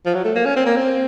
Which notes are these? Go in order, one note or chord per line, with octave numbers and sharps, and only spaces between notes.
F3
F#3
A3
A#3
C#4
C4
A#3
C4